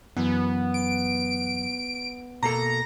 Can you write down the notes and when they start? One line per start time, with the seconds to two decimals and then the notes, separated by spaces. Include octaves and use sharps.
0.17 F#2 E3 B3
0.74 D7
2.43 B2 A#3 A4 A#5